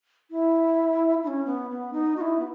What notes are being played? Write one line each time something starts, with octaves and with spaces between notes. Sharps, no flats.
E4
D#4
C#4
B3
B3
D#4
F#4
E4
B3